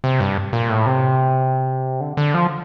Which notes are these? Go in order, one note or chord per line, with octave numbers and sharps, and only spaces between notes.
C3
G2
A#2
A2
C3
D3
D3
F3